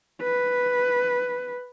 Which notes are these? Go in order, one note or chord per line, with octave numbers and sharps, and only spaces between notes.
B4